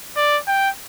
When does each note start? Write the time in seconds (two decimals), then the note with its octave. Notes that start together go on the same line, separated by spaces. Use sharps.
0.16 D5
0.48 G5